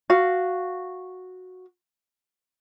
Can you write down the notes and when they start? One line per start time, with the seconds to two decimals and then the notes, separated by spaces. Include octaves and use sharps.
0.10 F#4 F5